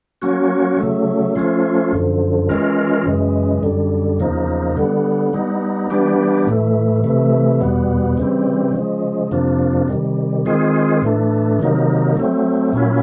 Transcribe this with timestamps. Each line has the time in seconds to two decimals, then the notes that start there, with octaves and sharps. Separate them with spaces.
0.22 F#3 A#3 C#4 F#4
0.79 C#3 F#3 A3
1.35 F3 A3 C#4 F4
1.93 F#2 D3 F3
2.49 E3 G#3 C#4 F4 A#4
3.06 F#2 C#3 E3 G#3
3.63 F#2 D3 G3
4.19 E2 C#3 F3 A#3 D#4
4.77 D3 G3 B3
5.33 G3 B3 D#4
5.90 E3 G3 B3 D4 G4
6.47 A2 E3 A3
7.04 C3 E3 A3
7.61 E2 B2 G3 B3
8.18 C#3 E3 G3 C4
8.74 C#3 F3 G#3
9.31 F2 C3 F3 A#3 D4
9.88 C3 D#3 G3
10.45 D#3 G#3 C4 F4 G#4
11.02 A2 E3 A3 D4
11.59 C3 D#3 F#3 A#3 D#4
12.16 F#3 A3 C4
12.73 A#2 F#3 A#3 C#4 E4